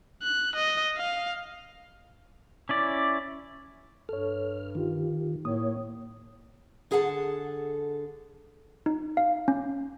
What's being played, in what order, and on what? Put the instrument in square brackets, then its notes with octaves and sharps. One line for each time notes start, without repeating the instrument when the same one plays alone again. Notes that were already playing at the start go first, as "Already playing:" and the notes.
[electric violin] F#6
D#5
F5
[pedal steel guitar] C#4 E4 D5
[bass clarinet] G2 [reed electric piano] A4 C#5 [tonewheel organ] F6
[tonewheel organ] D#3 [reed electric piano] D#4 F4 G4
[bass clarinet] A2 [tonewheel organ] A#3 C#5 [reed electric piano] D#6
[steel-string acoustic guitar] D3 G#4 A4 F#5 G#5 A5
[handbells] D#4
F5
C#4